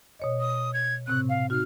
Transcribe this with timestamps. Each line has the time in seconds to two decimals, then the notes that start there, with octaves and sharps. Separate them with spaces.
0.19 B2 C#5 D#5
0.40 D#6
0.74 G#6
1.07 A2 C3 C4 F#6
1.29 F5
1.50 D#4 F#4 F6